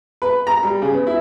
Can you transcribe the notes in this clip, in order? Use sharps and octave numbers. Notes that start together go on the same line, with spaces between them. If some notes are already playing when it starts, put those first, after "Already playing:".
B4
A#5
G3
C#3
B3
E4